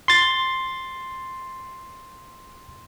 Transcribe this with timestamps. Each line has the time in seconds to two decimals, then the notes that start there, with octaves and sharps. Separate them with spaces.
0.08 C6 A6